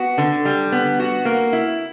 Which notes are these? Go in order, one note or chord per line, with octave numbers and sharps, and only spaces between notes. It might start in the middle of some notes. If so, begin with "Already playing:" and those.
Already playing: B3 F#4
D3
G3
B3
F#4
A#3
E4